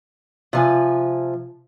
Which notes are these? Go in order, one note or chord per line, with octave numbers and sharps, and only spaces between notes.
C3 F3 G#5